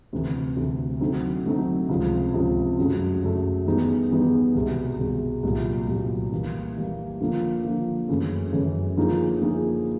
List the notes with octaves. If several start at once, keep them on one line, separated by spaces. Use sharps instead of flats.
D2 C3 E3
D2 C3 E3
D3 F#3 A3 C4 D#4
D3 F#3 A3 C4 D#4
C#2 C3 F3
C#2 C3 F3
F#2 C#3 F#3 A3
F#2 C#3 F#3 A3
E3 G3 B3 D#4 G#4
E3 G3 B3 D#4 G#4
C2 B2 G#3
C2 B2 G#3
C2 A#2 F#3
C2 A#2 F#3
E3 G3 A#3
E3 G3 A#3
D3 F3 A#3
D3 F3 A#3
F#2 C#3 E3 A3
F#2 C#3 E3 A3
D3 F3 A#3 D#4 G#4
D3 F3 A#3 D#4 G#4